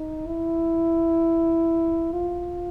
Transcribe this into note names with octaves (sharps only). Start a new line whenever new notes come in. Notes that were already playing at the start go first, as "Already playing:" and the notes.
Already playing: D#4
E4
F4